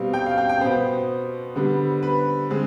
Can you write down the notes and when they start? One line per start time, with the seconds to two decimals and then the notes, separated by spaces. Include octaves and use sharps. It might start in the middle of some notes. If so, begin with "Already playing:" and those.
Already playing: B2 G3 C4 F5
0.14 G5
0.26 F5
0.38 G5
0.49 G5
0.61 B2 B3 C5
1.56 D3 G3 B3
2.03 B4
2.50 D3 G#3 C4